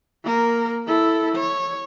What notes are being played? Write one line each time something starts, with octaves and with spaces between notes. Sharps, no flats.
A#3 A#4
E4 A4
C#5